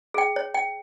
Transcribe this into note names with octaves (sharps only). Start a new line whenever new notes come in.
G#4 G5
C#5
G5